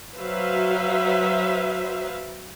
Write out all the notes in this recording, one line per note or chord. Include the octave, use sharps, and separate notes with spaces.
F#3 B4 C5 E5 F5